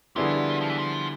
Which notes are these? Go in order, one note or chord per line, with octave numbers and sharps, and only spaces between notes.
D3 F3 G3 B3 E4 G#4
F3
E3
F3